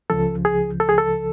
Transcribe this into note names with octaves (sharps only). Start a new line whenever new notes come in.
C#2 C#3 F3 A4
G#4
A4
G#4
A4